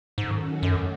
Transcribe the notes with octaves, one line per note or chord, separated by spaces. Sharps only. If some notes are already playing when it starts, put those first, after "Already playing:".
G#2 D#3 F#3 C#4 F#4 A4
F#2 D#3 F#3 A3